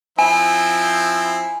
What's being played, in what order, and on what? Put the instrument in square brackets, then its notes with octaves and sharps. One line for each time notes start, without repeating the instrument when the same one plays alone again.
[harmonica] F3 C4 E4 [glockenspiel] G#5